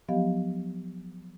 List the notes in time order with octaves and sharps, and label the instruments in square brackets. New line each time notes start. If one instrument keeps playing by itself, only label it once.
[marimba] F3 F#3 B3 G4 D#5 F5